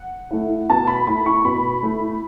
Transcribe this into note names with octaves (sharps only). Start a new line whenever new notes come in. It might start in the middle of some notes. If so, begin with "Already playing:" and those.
Already playing: F#5
A3 E4
B2 A5
B5
A3 E4 B5
C#6
B2 B5
A3 E4